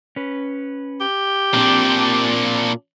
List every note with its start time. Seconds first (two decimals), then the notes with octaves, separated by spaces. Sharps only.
0.16 C#4 B4
1.01 G4
1.54 A#2 C4 D4